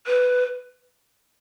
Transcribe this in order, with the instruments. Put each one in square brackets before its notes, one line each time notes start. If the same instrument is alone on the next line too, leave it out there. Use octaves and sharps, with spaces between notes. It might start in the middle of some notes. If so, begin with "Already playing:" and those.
[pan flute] B4